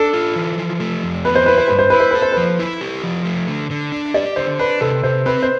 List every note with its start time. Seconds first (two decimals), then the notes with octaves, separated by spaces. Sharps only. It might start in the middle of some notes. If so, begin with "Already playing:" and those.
Already playing: D4 A4
0.13 F4
0.36 E3
0.58 F3
0.80 A3
1.04 F2
1.25 B3 B4
1.35 C5
1.46 E4 B4
1.58 C5
1.68 G2 B4
1.79 C5
1.90 E4 B4
2.00 C5
2.11 A4 B4
2.22 C5
2.33 F3 B4
2.59 E4
2.81 G4
3.04 F3
3.25 A3
3.48 D3
3.71 D3
3.92 D4
4.14 G4 D5
4.36 D3 C5
4.59 D4 B4
4.81 C3 A4
5.04 C3 C5
5.26 C4 B4
5.42 C5